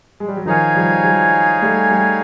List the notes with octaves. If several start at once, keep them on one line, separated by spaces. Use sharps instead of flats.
G#3
G3
F#3
D#3 F3 D#4 G#4 C#5 F5 G#5
F3 G3
F#3 G#3
G3 A3
G3 A3